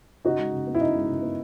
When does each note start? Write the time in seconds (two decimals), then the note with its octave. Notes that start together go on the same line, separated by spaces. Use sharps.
0.25 C#3 D#4 F#4
0.39 G#3
0.53 C#3
0.67 B3
0.75 E4
0.81 C#3 D#4
0.95 G#3
1.09 C#3
1.22 B3